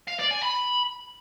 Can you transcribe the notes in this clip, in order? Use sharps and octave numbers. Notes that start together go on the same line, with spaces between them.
F5
D5
G#5
B5